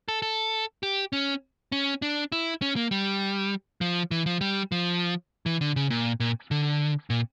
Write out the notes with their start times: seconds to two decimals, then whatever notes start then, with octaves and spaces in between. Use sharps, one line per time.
0.08 A4
0.22 A4
0.83 G4
1.13 C#4
1.72 C#4
2.02 D4
2.32 E4
2.62 C#4
2.76 A#3
2.91 G3
3.81 F3
4.11 E3
4.26 F3
4.41 G3
4.72 F3
5.46 E3
5.61 D3
5.76 C#3
5.90 A#2
6.20 A#2
6.51 D3
7.10 A#2